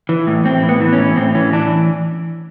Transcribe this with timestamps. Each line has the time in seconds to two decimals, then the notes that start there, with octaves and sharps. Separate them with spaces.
0.09 E3
0.27 A2
0.44 A2 C4
0.63 E3
0.69 B3
0.80 E3
0.93 C#4
0.98 A2
1.16 A2 C4
1.35 E3 C#4
1.52 E3 D4